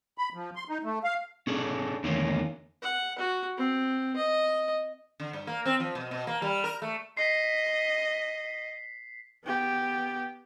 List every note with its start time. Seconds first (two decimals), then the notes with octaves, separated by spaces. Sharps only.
0.18 B5
0.34 F3
0.56 C6
0.69 D#4
0.84 A3
1.04 F5
1.47 C#4 G#4 A4 D5
2.04 E2 D3 D#3 A3 A#3 C#4
2.82 F#5
3.18 F#4
3.57 C4
4.16 D#5
5.20 D3
5.33 G2
5.47 A#3
5.66 C4
5.80 F3
5.95 B2
6.11 B2
6.27 A#3
6.42 G3
6.64 A#4
6.82 A3
7.17 D#5 B6 C7
9.44 B3 G4